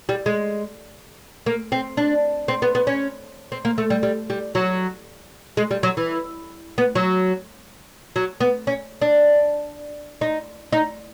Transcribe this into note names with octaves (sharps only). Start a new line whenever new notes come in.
G3
G#3
A#3
C4
D4
C4
B3
B3
C#4
C4
A#3
A3
G3
G3
G3
F#3
G#3
G3
F#3
E3
B3
F#3
F#3
B3
C#4
D4
D#4
D#4